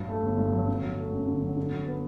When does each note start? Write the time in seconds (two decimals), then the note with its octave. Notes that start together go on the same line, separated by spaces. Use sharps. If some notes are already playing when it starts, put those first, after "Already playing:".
Already playing: G2 F#3
0.09 A3
0.23 G1
0.38 G2
0.53 F#3
0.68 D3
0.82 F#3
0.98 A3
1.12 F#2
1.27 D3
1.43 F#3
1.57 D3
1.72 F#3
1.87 B3